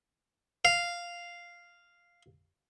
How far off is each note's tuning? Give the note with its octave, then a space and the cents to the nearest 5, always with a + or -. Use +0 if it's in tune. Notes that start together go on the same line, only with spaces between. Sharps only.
F5 -5